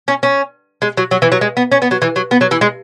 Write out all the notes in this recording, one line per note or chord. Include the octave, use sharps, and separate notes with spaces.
C#4
C#4
G#3
F#3
F#3
E3
F#3
G#3
B3
C#4
B3
F#3
E3
F#3
B3
F#3
E3
G#3